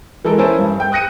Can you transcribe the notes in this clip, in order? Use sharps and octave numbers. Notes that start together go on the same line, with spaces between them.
E3 G#3 A4 A#4
C#4 E4 A#4 C5 G#5 A5
G2
G5 G6
D#6 F#6 A#6 C#7 D#7